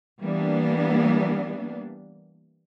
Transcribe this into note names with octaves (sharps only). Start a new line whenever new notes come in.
E3 G3 A#3 B3 D4